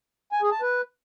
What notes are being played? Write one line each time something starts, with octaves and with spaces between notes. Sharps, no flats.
G#5
G#4
A5
B4